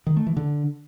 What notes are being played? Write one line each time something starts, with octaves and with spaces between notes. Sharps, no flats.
D#3
A3
E3
D3